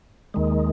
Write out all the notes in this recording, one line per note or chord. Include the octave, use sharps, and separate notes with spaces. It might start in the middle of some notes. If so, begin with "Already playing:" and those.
D#2 D#3 G#3